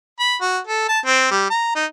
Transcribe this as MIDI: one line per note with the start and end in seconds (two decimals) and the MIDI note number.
0.20 0.36 83
0.41 0.58 66
0.67 0.86 69
0.89 0.99 81
1.06 1.27 60
1.31 1.48 55
1.50 1.75 82
1.75 1.85 63